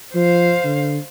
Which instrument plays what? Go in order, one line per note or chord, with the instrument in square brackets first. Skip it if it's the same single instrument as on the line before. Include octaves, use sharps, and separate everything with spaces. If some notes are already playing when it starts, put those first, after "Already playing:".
[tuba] F3 [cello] C5 F5
[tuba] D3